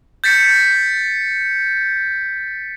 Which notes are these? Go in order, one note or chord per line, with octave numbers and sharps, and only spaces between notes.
G6 A6 B6 C#7